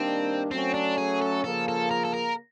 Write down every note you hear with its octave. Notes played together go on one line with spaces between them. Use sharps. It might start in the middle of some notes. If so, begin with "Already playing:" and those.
Already playing: D#3 G3 A#3 C4 D4
F#3 A3 C4 C#4
D4
G#4
A4
C#3 F3 A#3 A4
A4
A#4
A4
A#4